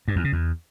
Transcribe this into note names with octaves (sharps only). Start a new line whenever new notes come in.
G2
E2
C#3
E2